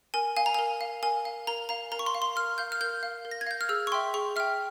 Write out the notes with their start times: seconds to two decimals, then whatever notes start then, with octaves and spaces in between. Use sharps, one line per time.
0.14 A#4 G#5
0.37 F5 G#5
0.46 A#5
0.54 A#4 G#5
0.81 F5
1.03 A#4 G#5
1.25 F5
1.47 A#4 A#5
1.69 F5 A#5
1.92 A#4 A#5
1.99 C#6
2.06 C6
2.15 F5
2.22 C6
2.36 A#4 F6
2.58 F5 G6
2.72 F6
2.81 A#4 G6
3.03 F5
3.25 A#4
3.31 A#6
3.41 G#6
3.47 F5 G6
3.61 F6
3.69 G#4 E6
3.87 C#6
3.92 E5 G5 C6
4.14 G#4 C#6
4.36 E5 G5 F6